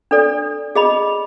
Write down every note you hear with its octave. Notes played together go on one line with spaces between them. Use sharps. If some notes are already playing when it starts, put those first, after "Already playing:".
D4 A4 D5
G#4 D#5 B5